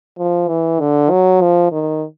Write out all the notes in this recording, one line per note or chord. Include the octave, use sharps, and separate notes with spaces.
F3
E3
D3
F#3
F3
D#3